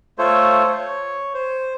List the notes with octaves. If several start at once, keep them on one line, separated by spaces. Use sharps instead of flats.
A3 F4 A4 C5 C#5
C#5
C5